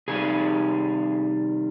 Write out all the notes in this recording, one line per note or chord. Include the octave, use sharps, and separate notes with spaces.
C3 D#3 G3 G#4